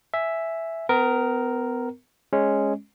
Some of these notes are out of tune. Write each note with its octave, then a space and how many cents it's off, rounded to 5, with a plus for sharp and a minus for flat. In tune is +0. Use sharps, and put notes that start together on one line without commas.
E5 +0 G#5 +0
B3 +35 A#4 +0
G#3 +0 C#4 +0